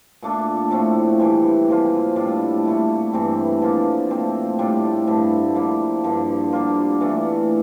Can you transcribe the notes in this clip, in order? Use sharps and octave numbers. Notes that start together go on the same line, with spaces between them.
A#2 A3 D4 F4
A2 F3 A3 C4
E3 G3 C4
A#2 F3 C4 F4
A2 G3 D4 F4
A#2 A3 E4
G2 E3 A3 C4
D3 F3 A#3 F4
A#2 A3 C4
A2 G3 D4 F4
G2 D3 F3 A3
F3 A#3 E4
G2 D3 F3
D3 G3 A#3 F4
E3 A3 D4 F4